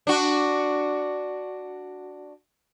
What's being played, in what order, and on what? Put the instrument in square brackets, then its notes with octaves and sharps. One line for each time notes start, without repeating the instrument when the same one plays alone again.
[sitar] D4 F#4